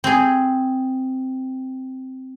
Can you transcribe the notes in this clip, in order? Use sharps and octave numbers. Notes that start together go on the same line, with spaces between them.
C4 G#4